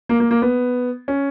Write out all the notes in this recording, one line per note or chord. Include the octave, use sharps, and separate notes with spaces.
A#3
A#3
A#3
B3
C#4